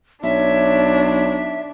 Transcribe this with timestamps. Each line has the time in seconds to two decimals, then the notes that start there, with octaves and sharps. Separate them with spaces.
0.23 B1 D4 C#5 E5